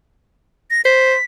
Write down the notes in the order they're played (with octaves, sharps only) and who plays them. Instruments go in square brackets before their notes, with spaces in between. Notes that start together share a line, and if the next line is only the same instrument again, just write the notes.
[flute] A#6
[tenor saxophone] C5 [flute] B6